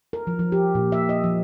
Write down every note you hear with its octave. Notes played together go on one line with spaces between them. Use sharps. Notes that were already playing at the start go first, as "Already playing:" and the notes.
A#4
F3
F3
G4
A#2
E5
D#5
F3